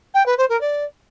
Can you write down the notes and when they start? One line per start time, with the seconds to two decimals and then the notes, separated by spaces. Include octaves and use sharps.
0.14 G5
0.26 B4
0.37 C5
0.49 A#4
0.61 D5